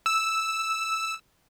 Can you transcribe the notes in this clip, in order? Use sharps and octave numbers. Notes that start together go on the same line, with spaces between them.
E6